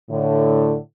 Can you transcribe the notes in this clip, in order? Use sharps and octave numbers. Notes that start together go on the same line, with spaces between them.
A2 D3